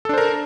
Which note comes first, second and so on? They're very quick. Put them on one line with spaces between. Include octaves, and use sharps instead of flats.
A4 D4 C5 A#4